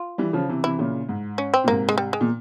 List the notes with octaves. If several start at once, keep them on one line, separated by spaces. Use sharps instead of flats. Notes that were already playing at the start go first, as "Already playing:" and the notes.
Already playing: F4
E3 G3
C#3 F3
C3 E3
C3 E3 E4
A#2 C#3
G#2
C#4
C4
A#2
G#2 C3 A#3
G#3
G3
G#3
A#2